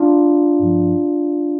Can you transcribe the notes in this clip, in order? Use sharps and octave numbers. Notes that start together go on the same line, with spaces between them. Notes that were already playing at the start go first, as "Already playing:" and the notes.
Already playing: D4 F4
G2 F3